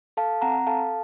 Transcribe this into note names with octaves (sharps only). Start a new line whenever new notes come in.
A4 F5 A5
C4 F#5 A#5
A4 F5 A5